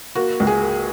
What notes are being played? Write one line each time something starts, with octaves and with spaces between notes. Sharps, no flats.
A#3 F#4
C#2
G#4
A#3